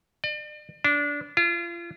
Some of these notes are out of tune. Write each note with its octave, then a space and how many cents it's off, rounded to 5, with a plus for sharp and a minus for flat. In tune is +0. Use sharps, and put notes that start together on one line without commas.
D5 +40
D4 -20
F4 -35